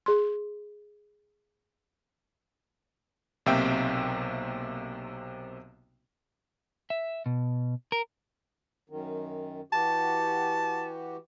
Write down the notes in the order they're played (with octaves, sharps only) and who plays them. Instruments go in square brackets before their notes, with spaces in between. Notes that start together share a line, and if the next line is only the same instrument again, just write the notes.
[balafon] G#4 C6
[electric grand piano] B1 C3 A#3 C4 E5 G5
[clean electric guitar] E5
B2
A#4
[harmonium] F#2 D#3
[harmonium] E3 F#4 G4 [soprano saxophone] A5